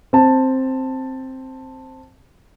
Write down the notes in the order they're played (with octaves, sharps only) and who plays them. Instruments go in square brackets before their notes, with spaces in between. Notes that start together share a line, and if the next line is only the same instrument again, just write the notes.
[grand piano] C4 A5